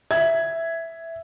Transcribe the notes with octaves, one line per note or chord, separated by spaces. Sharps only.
E5 G#6